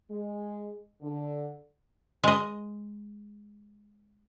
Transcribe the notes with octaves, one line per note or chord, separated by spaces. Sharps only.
G#3
D3
G#3 D#5